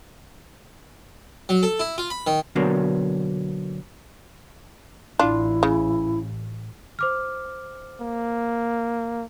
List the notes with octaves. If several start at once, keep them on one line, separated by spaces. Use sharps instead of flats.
F#3
A4
E4
F4
B5
D#3
B2 D3 F#3 A#3
A1 D4 E4 F4
C#3
C5 D6 F6
A#3